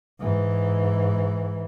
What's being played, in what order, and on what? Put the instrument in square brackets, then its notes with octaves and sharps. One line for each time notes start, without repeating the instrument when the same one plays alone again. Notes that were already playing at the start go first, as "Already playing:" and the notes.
[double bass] G#2 E3